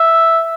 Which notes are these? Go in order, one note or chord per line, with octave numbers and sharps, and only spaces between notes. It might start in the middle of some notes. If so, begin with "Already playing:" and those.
Already playing: E5